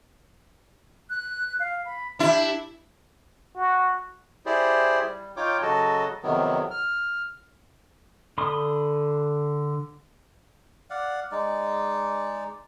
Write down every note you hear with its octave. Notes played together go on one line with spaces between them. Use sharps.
F#6
F5
B5
D4 E4 G4
F#4
E4 G4 G#4 C5 D5
G3
D#4 F4 C#5 G5 D6
C#3 F#3 F#4 A4 D#5 A5
F2 C3 D#3 F#3 B3
F6
D3 B5 C6 D#6
D5 F5 F#5
G#3 D#4 D5